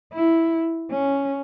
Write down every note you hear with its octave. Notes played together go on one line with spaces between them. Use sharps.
E4
C#4